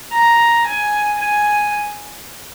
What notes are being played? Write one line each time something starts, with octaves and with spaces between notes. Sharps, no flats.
A#5
G#5
G#5